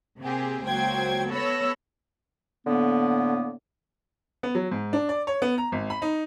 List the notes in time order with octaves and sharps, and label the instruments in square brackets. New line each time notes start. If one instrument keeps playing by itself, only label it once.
[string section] C3 A#3 C4 G4 G#4
C#2 F#3 A#3 C5 G5 G#6
B3 A4 C#5 B5 E6 A#6
[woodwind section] A2 D3 A#3 B3
[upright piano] B3
F#3
G#2
D4
D5
C#5
B3
A#5
G#1
B5
D#4